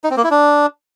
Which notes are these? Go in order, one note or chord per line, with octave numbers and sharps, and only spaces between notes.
D#4
C4
A#3
E4
D4